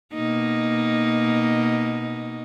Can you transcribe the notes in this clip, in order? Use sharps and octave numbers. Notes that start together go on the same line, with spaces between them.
B2 A#3 D#4